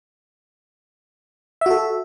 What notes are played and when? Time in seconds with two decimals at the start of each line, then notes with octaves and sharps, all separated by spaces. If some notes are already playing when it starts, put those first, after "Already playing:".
1.61 E5
1.66 F#4
1.71 A4